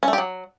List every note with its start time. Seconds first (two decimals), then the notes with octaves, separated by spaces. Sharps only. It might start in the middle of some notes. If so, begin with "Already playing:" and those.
0.03 C#4
0.08 A3
0.13 G4
0.18 F#3